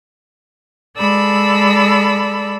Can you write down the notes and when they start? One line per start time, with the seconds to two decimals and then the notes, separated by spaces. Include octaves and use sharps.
0.98 G#3 A4 D5 B5 E6